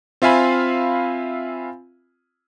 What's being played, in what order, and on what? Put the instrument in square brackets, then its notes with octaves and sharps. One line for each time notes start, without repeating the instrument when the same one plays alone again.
[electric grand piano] C4 F4 E5 F5 G#5 B5